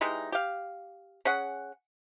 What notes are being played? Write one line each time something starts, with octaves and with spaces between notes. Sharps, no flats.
E3 G3 G#3 D#4
G4 F5
C#4 G#4 F#5